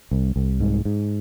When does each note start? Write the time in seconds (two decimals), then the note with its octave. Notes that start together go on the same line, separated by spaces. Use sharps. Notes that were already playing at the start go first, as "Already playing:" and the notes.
0.11 C2
0.36 C2
0.60 G#2
0.85 G#2